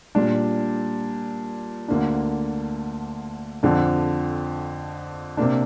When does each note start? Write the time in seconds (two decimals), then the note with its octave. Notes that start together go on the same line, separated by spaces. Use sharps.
0.15 A#2 G3 D4
1.88 D2 D3 A#3 D4
3.63 F2 D3 F3 D4
5.37 C3 A#3 D4